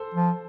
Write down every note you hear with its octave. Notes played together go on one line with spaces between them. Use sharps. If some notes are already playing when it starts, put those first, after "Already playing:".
Already playing: A4 C5
F3